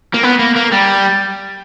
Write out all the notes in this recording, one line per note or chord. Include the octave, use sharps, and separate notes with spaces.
A#3
B3
A#3
A#3
G3